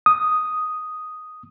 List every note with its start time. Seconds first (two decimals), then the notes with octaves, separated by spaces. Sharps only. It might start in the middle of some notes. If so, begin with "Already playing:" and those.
0.06 D#6